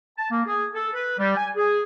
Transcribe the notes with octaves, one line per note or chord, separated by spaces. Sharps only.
A5
A#3
G#4
A4
B4
G3
G#5
G#4